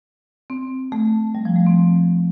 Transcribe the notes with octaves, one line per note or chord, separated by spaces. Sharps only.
C4
A3
G3
F3
A3
C4